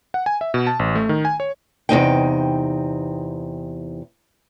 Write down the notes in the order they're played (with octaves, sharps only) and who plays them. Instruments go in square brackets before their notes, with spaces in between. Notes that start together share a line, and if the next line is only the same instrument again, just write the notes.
[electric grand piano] F#5
G#5
E5
B2
A5
A1
A3
D#3
G#5
C#5
[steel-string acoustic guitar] E2 C3 D#4 G5